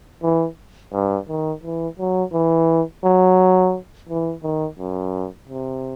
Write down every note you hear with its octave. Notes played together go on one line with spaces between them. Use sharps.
E3
G2
D#3
E3
F#3
E3
F#3
E3
D#3
F#2
C3